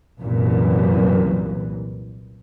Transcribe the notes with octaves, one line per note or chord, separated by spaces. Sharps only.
C2 F#2 A#2 E3